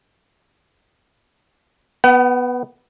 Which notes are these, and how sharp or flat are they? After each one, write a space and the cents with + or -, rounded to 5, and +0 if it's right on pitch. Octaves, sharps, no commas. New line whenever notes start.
B3 +0 F#5 +40